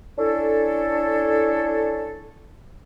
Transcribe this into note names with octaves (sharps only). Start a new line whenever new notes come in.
C#4 D4 E4 A4